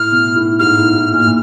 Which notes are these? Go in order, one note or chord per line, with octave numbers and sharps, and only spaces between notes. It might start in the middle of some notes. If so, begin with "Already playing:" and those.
Already playing: A2 F6
B2
A2
G#2 F6
A2
A2
A#2
F6
A#2